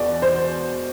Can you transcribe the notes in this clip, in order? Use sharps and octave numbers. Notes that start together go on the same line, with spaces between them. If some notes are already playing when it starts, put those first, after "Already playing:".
Already playing: E1 E2 B2 D5
C5